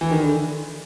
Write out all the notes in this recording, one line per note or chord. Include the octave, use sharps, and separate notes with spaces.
E3
D#3
D3